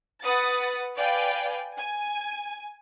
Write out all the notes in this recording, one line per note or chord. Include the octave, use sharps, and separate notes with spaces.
B4 F#5 D#6 A6
B4 D5 F5 G5 G#5
G#5